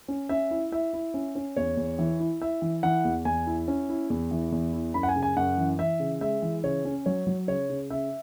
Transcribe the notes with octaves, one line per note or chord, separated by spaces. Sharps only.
C#4
C#4 E5
E4
E4 E5
E4
C#4
C#4
E2 C#5
E2
E3
E4
E4 E5
E3
E3 F#5
E2
E2 G#5
E4
C#4
E4
E2
E3
E2
E4
F#2 B5
F#5
G#5
C#3
G#5
F#2 F#5
E3
E3 E5
C#3
G#3 E5
E3
C#3 C#5
C#4
F#3 C#5
F#3
C#3 C#5
C#3
C#3 E5